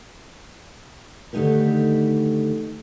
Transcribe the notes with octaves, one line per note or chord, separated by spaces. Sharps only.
D3 D#3 A3 D#4 G4 B4